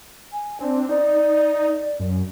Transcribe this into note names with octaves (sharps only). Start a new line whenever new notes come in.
G#5
C4 D4
D#4 D5
F#2